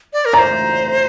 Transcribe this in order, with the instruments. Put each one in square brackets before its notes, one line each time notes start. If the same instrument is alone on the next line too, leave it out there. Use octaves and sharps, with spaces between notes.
[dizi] D5
A#4
[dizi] D5 [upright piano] A#5
[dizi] C5